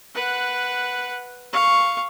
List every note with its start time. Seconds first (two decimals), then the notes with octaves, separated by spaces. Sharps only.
0.15 B4 F#5
1.53 F5 C#6